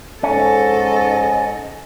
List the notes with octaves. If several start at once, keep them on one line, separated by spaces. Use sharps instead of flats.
G#2 C#4 A4 D#5